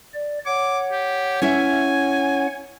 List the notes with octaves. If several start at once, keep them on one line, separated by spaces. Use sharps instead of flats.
D5
C#5 F#5 D6
G4
C#4 E4 E5 G#5